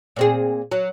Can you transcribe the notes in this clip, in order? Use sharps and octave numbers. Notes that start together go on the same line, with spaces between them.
A#2 C4 G#4
F#3